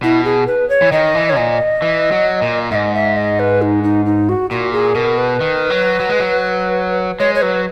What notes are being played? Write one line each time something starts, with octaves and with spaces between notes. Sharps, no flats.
B2 E4
G#4
B4
C#5
E3
D#3 D#5
E3
C#5
A#2 D#5
E3
F#3
A#2
G#2 D#5 E5
E5
D#5
B4
D#4
D#4
D#4
F#4
A#2 F#4
G#4
B2 A#4
B4
D#3
F#3
F#3
G#3
F#3
G#3 C#5
C#5
F#3 B4